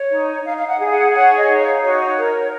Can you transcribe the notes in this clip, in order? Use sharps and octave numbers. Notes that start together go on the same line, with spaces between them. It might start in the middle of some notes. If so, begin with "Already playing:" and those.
Already playing: C#5
D#4
D#4 F5
F5
F#5
G#4
F5
F#5
C#5 F#5
D#5
D#4
F5
F#4 C#5
A#4